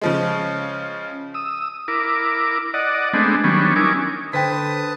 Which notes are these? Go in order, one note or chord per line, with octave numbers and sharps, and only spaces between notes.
C#3 F3 G#3
D#6 E6
E4 A#4 D6
D5 D#5 F#5
G#3 A3 B3 C4 D4
D#3 F#3 G3 B3 C#4 D4
C#4 D#4 E4 A#4 G#5 D6
D3 B4 C5 G5 A5 D#6 B6